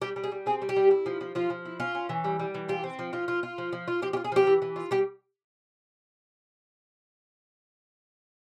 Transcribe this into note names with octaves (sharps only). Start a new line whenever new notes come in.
G3 G4
G3
G#4
G3
C4 G#4
G3
G4
G3
E4
F3
F3
F3 F4
F3
E4
C#4 F4
C#4
E3
G3
G3
E3
F4 G4
C4
F3
F3 F4
F4
F4
F3
F3
F4
F3 G4
G4
F4
G#4
F3 G4
E3
E3
F4
G3 G4